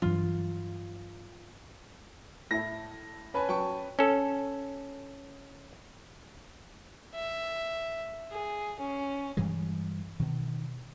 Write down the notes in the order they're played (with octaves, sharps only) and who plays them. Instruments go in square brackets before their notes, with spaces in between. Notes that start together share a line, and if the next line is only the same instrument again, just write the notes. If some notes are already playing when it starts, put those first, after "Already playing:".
[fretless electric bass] G2 E3 F#3 [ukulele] F4
[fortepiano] A2 E4 [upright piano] A#6
[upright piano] C#4 B4 [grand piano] G#5 A5 B5
[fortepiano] F#3 [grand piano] G5 A5 C#6
[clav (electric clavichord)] C#4 A4
[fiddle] E5
G#4
C#4
[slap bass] G2 E3 G3 G#3
B2 D#3